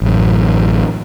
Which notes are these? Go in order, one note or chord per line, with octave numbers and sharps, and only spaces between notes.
A1 F#2